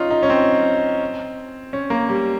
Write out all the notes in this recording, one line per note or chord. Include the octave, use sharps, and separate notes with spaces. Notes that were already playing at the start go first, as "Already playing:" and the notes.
Already playing: C#4 D#4 F4
D#4
C#4
C4
C#4
A#3
G3